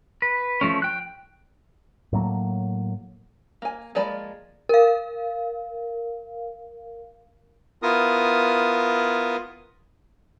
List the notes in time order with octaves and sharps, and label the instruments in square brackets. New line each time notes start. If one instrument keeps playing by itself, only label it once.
[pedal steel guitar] B4
F3 A3 C#4
G5 F#6
[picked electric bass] A2 F#3 A#3
[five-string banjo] A#3 G#5
F3 G#3 A#3 D5 B5
[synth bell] A#4 F5
[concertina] B3 E4 F4 A#4 D#6